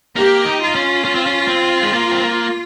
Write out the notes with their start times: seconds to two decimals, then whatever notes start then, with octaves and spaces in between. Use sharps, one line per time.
0.15 A#3 G4
0.45 D#4
0.60 F4
0.75 C#4
1.05 C#4
1.15 C4
1.26 C#4
1.48 C4
1.83 G#3
1.93 A#3
2.11 C4
2.21 A#3